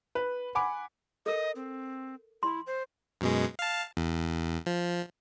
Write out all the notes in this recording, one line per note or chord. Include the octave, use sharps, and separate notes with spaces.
B4
F#5 G#5 B5 D6
A4 A#4 D#5
C4
E4 C6
C5
F#2 B2 G#3
F5 A5
E2
F3